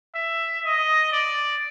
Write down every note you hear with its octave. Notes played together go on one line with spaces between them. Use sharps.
E5
D#5
D5